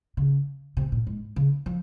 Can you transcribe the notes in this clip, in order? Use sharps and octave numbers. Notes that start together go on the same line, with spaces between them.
C#3
C3
A#2
G#2
C#3
F3